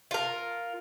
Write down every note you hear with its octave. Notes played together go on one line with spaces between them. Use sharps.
F4 A#4